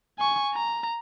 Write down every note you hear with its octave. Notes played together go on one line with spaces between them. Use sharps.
G#5 C#6
A#5